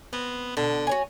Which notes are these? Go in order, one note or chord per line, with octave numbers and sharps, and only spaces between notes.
B3 C4
B2 D3
F#4 C#5 G#5